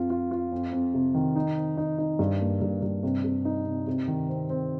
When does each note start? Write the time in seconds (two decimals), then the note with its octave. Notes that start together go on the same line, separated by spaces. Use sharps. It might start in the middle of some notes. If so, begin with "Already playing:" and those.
Already playing: F2 F4
0.10 F4
0.31 F4
0.52 F2
0.72 F2
0.94 C3
1.14 D#3
1.36 D#4
1.57 C4
1.77 D#4
1.98 D#4
2.19 G2
2.40 A#3
2.62 G2
2.82 G2
3.03 C3
3.24 C3
3.45 D#4
3.66 C3
3.87 C3
4.08 D#3
4.29 C4
4.50 C4